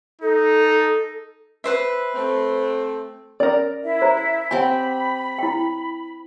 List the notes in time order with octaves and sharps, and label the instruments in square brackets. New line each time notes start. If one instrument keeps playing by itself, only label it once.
[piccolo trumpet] D#4 [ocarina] A4
[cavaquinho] B4 C5 E5
[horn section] A3 C4
[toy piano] C#4 [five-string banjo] A#4 D5
[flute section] E4 E5
[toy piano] C5 A#5
[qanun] C4 G4 [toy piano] F#5 G#5 [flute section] B5
[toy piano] E4 G5